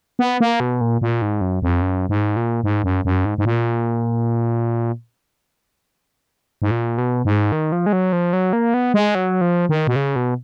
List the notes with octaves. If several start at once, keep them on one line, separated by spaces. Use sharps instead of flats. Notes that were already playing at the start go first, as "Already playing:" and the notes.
B3
A#3
B2
A#2
A#2
G#2
F#2
F2
F#2
G#2
A#2
G#2
F#2
F#2
G#2
G#2
A#2
G#2
A#2
B2
G#2
D#3
F3
G#3
F#3
F3
F#3
A#3
B3
G#3
F#3
F3
D#3
B2
C#3
B2